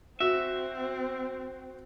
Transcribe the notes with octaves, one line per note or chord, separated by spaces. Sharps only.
C4 F#4 E5